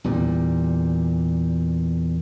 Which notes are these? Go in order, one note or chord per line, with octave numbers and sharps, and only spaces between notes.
E2 A#2 G3